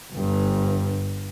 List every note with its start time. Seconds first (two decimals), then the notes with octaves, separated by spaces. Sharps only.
0.12 G1 G2